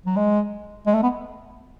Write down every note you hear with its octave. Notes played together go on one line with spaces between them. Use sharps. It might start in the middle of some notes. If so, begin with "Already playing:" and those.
F#3
G#3
G#3
A3
B3